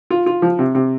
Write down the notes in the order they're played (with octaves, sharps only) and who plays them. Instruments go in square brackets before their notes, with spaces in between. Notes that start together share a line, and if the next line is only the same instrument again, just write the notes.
[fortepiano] F4
F4
F3
C3
C3